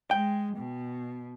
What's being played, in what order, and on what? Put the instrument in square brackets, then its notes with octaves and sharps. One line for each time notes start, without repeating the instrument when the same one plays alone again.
[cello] G#3 [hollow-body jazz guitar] G5
[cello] B2